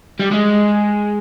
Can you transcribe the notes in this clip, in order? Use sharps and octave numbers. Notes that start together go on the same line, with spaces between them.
G3
G#3